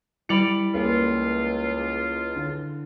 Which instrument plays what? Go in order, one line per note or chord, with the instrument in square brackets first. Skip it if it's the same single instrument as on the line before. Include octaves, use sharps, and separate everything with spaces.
[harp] G3 D5 B5 [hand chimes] E4 D7 [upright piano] C#7 F7 F#7
[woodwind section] C#2 F4 [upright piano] A#3
[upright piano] D3